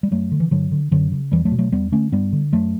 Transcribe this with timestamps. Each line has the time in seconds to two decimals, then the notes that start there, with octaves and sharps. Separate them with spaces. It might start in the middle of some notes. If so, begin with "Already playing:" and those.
0.03 G3
0.11 F#2 F#3 A3
0.32 D3
0.40 E3
0.51 G2 D3 F#3
0.72 D3
0.91 F#2 D3 F#3
1.12 C#3
1.32 E2 E3 G3
1.45 F#3 A3
1.52 B2
1.59 F#3 A3
1.72 E2 G3 B3
1.92 D3 A3 C#4
2.12 G2 G3 B3
2.33 D3
2.53 F#2 F#3 A3